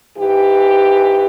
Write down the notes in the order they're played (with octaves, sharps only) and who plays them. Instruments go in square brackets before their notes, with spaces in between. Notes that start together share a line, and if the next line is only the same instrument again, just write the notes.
[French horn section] G#2 E3 G4